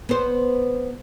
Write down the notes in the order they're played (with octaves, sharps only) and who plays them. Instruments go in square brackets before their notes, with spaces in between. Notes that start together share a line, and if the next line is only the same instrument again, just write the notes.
[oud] B3 C5